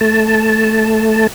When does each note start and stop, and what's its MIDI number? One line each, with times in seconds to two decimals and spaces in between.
0.01 1.27 57
0.01 1.27 81